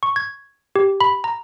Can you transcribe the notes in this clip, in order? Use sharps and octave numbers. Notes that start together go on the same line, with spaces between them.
C#6
G#6
G4
B5
A#5